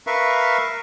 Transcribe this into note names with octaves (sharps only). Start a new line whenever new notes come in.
A#4 B4 E5 F5 C#6